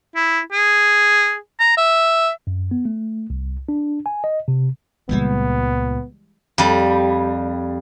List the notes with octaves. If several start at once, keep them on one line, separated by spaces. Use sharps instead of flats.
E4
G#4
A#5
E5
F#2
B3
A3
C2
D4
G#5
D#5
C3
C#2 A#2 E3 G3 G#3 B3
F2 G3